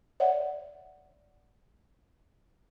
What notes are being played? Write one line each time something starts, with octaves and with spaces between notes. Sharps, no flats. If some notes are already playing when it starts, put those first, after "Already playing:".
C#5 D5 E5 F#5